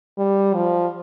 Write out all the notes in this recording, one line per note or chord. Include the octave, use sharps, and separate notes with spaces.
G3
F3